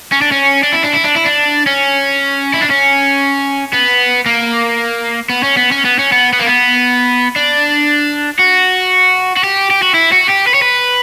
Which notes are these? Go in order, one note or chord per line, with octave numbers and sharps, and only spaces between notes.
C#4
D4
C#4
D4
E4
D4
E4
D4
E4
D4
C#4
E4
D4
C#4
B3
A#3
B3
C#4
B3
C#4
B3
C#4
B3
B3
A#3
B3
D4
F#4
F#4
G4
G4
F#4
E4
F#4
G4
B4
C#5
B4